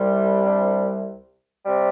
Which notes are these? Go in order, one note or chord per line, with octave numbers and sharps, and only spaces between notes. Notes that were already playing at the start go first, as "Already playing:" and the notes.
Already playing: C2 C3 G3
D4
C3 G3